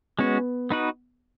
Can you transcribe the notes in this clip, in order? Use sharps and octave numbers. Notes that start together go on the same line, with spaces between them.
G#3 B3 C#4 F#4
B3 D#4 F#4 B4